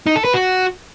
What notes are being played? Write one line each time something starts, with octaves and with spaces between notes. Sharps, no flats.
D#4
A4
B4
F#4